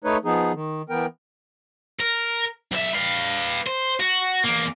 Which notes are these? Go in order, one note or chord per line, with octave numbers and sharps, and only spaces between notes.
A3 D#4 B4 C#5
F3 B3 D#4 G#4
D#3
E3 B3 A#4 G5
A#4
B1 E5
B4 F5
C5
F#4
E2 A#3